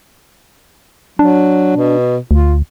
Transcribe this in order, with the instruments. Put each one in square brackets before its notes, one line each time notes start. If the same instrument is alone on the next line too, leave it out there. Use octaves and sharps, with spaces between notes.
[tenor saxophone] F#3 [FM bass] D4
[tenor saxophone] B2
[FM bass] D2 [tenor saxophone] F4